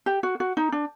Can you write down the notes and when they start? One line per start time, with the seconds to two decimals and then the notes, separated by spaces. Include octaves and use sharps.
0.06 G4
0.23 F#4
0.40 F#4
0.57 D#4
0.72 D4